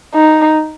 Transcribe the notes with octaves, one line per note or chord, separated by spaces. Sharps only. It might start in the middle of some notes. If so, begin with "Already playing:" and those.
D#4